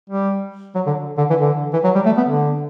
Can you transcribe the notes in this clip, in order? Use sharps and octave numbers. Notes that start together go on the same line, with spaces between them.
G3
F#3
D3
D3
E3
D3
E3
F#3
G3
A3
B3
D3